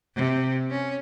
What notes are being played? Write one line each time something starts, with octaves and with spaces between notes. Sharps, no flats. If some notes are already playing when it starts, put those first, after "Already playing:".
C3
C#4